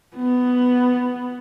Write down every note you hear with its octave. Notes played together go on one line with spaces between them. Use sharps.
B3